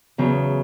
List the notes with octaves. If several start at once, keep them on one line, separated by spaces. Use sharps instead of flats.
E2 C#3 F#3